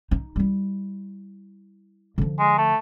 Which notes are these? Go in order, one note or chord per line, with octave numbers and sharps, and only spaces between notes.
D#4
G3 E4
D3 F3
G#3
A3